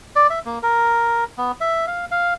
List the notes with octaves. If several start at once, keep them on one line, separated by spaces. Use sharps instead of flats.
D5
E5
A#3
A#4
B3
E5
F5
F5